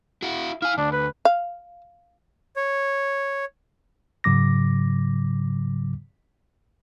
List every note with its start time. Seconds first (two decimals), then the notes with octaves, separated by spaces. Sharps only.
0.22 E4 F#4
0.62 E4 F5 G#5
0.78 D2 D4
0.92 B4
1.25 F5
2.56 C#5
4.24 G#2 C#3 F#3 D6 A#6